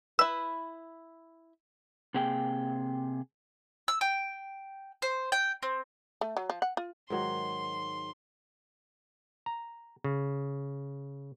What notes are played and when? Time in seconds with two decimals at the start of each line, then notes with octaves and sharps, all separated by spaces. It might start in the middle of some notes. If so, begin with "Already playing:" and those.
0.19 E4 B4 E6
2.14 C3 A#3 G#4 G5
3.88 E6
4.01 G5
5.02 C5
5.32 G5
5.63 C4
6.21 A3
6.37 F#3
6.50 F3
6.62 F#5
6.77 F4
7.10 G#2 D#3 F#3 C6
9.46 A#5
10.04 C#3